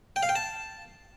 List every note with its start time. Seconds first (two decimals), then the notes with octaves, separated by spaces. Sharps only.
0.16 G5
0.23 F5
0.29 G5
0.36 A5